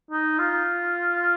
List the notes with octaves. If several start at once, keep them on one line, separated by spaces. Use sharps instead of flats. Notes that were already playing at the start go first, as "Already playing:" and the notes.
D#4
F4